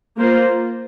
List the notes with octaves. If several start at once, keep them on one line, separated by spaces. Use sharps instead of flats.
A#3 F4 C5